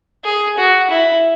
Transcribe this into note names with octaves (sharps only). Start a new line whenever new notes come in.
G#4
F#4
E4